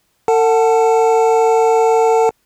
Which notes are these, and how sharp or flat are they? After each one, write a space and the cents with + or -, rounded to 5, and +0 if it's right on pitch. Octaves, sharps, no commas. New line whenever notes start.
A4 +45 F#5 +0 A5 +0